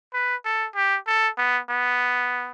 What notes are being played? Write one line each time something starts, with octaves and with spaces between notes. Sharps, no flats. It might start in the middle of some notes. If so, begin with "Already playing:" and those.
B4
A4
G4
A4
B3
B3